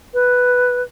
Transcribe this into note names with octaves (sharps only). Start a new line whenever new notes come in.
B4